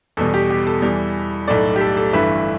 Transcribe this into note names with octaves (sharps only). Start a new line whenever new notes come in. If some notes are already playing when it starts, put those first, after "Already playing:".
E2 B2 G3 A4
G4
G4
A4
E2 E3 G3
B1 A2 A3 A4 D5
G4
A4
A4
G1 G2 E3 A3 B4 E5